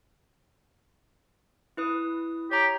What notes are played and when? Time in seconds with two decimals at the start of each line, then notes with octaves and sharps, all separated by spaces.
1.77 E4 B4 D#6
2.51 G4 C#5 A#5